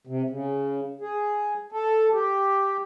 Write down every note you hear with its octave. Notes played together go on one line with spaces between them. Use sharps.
C3
C#3
G#4
A4
G4